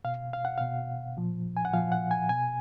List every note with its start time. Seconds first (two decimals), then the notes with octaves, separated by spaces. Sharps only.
0.04 B2 F5
0.33 F5
0.45 F#5
0.58 B2 F5
1.17 A#2 F3
1.57 G#5
1.65 F#5
1.73 A#2 F3 F5
1.92 F#5
2.11 G#5
2.29 B2 G#5